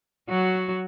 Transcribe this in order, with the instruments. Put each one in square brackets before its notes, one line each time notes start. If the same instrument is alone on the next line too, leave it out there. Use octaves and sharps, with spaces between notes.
[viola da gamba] F#3 F#4